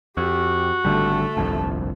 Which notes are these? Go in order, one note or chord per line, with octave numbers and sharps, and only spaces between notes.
F2 F#4 G4
G#1 D3 G3 A3 A4
G1 C2 F2